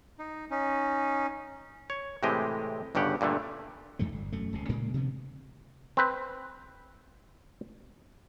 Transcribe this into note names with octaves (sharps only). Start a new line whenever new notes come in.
D#4
C#4 D#4
C#5
A2 C3 E3 G#3 G4 D#5
G1 G2 C#3 G4 F#5
G2 A#2 D3 A3
F2 G#2 F3 A3
G1
E1 F#2 A3
D1 C#2 C3
A2 C#3 G#3 A#3
B2 D3 F3 B3
C4 B4